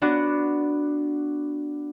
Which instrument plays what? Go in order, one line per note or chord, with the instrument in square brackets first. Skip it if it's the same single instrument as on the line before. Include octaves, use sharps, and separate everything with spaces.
[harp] B3 D4 F#4